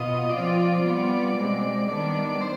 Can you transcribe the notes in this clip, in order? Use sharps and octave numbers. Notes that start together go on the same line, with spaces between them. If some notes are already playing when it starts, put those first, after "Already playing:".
Already playing: B2 B3 F4 D#5
F3 C4 F4 D5
G3 B3 F4
B2 G#3 C4
D#3 G3 B3 D4 D5
C5